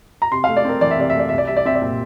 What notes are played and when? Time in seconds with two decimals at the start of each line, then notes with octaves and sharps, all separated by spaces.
0.22 A#5
0.32 C3 C6
0.44 F5
0.49 A3
0.57 D5
0.65 C4 A#4
0.81 E3 D5
0.91 E5
0.98 C3 D5
1.10 E5
1.15 A3 D5
1.29 C2 E5
1.38 D5
1.47 G3 E5
1.57 D5
1.65 C4 E5
1.75 D5
1.82 A#2